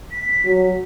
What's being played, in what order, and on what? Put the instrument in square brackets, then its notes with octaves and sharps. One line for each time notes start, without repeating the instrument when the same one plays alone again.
[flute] B6
[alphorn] F#3